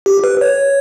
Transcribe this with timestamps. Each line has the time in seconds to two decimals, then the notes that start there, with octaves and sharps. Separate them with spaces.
0.06 G4
0.24 B4
0.41 C#5